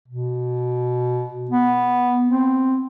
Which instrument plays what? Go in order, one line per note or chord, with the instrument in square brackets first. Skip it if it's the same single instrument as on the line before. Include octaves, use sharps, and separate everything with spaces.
[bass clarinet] B2
B3
C4